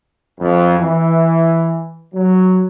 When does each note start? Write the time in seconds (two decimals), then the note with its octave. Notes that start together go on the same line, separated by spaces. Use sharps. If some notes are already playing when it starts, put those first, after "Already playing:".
0.39 F2
0.80 E3
2.13 F#3